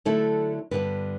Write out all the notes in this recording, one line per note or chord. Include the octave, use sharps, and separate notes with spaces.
D3 F#3 A3 E4 A4
G2 D3 G3 B3 B4